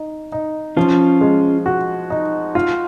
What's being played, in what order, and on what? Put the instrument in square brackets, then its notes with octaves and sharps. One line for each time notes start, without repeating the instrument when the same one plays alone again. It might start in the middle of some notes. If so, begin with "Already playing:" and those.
Already playing: [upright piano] D#4
D#4
[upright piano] F3 [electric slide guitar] C#4 F4
[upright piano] G#3
F#4
D#4
F4